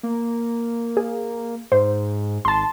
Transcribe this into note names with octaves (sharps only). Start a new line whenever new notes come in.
A#3
G#4
G#2 C5
G#1 A5 C6